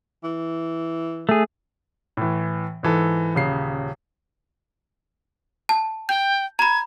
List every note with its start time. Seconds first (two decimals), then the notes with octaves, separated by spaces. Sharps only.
0.24 E3
1.29 A3 G#4
2.17 A2 E3
2.83 G#2 E3 A4
3.35 D#1 C#3 C7
5.69 A5
6.09 G5 G6
6.59 A#5 B5 G#6